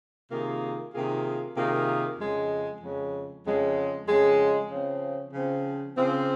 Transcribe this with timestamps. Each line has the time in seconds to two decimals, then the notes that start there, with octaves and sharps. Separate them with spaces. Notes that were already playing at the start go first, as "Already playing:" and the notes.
0.30 C3 D#3 A#3 F4 G#4
0.93 C3 D#3 A#3 F4 G#4
1.56 C3 D#3 A#3 F4 G#4
2.19 F2 C#3 G#3
2.81 F2 C#3 G#3
3.45 F2 C#3 G#3
4.08 F2 C#3 G#3
4.71 C#3 F3 C4
5.33 C#3 F3 C4
5.97 C#3 F3 C4